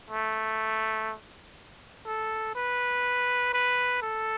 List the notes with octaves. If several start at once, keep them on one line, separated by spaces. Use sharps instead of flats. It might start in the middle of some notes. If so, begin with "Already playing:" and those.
A3
A4
B4
B4
A4